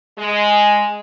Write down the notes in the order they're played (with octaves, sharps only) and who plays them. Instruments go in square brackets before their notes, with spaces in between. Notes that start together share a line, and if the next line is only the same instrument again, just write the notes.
[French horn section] G#3